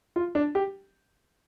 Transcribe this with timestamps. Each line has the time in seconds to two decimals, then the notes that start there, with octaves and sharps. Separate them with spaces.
0.16 F4
0.35 D4
0.55 G4